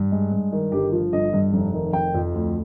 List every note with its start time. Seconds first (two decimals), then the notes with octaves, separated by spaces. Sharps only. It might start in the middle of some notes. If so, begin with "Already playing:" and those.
Already playing: G2
0.12 G#3
0.32 G2
0.52 D#3
0.72 G1 G4
0.92 F3
1.13 G1 D#5
1.33 G2
1.53 F1
1.74 D#3
1.93 F1 G5
2.14 F2
2.34 D2